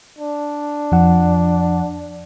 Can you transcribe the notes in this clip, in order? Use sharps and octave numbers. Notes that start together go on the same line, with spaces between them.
D4
F2 F3 F#5